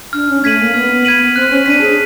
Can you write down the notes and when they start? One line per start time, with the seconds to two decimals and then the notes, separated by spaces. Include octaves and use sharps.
0.13 D4 F6
0.29 C#4
0.44 A3 G#6 B6 D#7 F#7
0.59 A#3
0.74 B3 F6
1.05 G#6 B6 D#7 F#7
1.35 C4 F#6
1.50 C#4
1.66 D4 B6 D#7
1.81 G#4